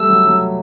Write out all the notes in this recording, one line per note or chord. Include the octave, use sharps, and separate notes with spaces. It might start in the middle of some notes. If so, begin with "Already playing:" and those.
Already playing: G3 A3 E6
F#3
F#3